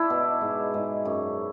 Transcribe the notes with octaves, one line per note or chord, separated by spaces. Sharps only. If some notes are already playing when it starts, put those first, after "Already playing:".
Already playing: D4 E4
B2
G#2
G#2
F#2